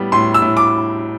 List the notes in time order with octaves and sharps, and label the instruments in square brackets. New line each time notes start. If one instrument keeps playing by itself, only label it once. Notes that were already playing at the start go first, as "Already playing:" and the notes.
Already playing: [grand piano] A2 G3 B3
A2 C6
E6
A2
D6